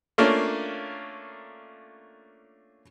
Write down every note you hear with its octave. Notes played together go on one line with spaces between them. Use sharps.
A3 A#3 C#4 D4 F4 A#4